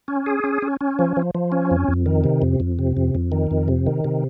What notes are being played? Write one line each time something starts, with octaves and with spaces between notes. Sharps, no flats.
C#4
G#4
C#4
C#4
C#4
F3
F3
F3
C#4
F2
F2
D#3
C3
F2
F2
C3
F2
F2
D#3
F2
C3
D#3
C3